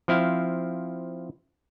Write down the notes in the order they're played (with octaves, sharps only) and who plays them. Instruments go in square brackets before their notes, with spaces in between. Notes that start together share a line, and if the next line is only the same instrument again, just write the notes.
[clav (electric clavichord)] F3 C4 E4 F5